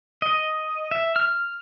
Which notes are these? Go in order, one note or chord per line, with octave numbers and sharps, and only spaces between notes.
D#5
E5
F6